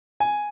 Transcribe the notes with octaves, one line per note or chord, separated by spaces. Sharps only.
G#5